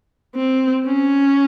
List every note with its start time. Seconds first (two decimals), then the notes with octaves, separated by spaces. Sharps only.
0.35 C4
0.86 C#4